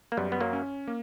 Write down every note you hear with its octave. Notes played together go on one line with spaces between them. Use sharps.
A#3
F#2 G3 B3
B3
F#3 A#3
C#4
A#3